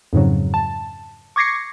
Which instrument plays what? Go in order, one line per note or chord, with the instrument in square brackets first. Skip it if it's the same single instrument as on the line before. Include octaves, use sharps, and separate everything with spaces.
[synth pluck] F2 G#2 C#3 F#3
A5
C#6 D6 G#6 A#6 C7 C#7